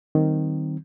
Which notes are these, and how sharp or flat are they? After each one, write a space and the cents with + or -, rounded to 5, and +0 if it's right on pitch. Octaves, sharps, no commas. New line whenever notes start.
D#3 +0 G3 -30 C4 +0